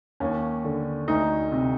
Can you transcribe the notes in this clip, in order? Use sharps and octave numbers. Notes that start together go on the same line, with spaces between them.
D#2 C#4
D3
D2 D#4
C3